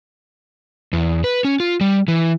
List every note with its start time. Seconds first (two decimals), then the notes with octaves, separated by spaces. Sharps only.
0.93 E2
1.24 B4
1.45 C#4
1.60 F4
1.81 G3
2.08 E3